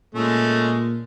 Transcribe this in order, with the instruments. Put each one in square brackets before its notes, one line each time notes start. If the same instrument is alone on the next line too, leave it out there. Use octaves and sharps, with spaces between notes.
[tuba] A#2 [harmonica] G#3 A3 C#4